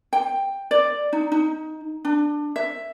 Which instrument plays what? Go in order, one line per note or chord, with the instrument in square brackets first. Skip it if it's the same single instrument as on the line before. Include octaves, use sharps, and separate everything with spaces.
[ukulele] G5
D5
D#4
D#4
D4
E5